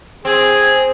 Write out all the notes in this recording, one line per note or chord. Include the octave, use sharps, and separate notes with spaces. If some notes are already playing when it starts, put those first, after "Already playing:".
C4 G#4